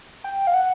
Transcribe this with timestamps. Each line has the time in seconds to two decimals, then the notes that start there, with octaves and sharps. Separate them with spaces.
0.24 G5
0.47 F5
0.54 F#5